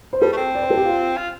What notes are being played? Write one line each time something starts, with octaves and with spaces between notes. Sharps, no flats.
C5
G3 A4
A3
C4
D5
C5
A4
G4
F4
F4